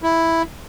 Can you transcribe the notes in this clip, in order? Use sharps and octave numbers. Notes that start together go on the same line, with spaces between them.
E4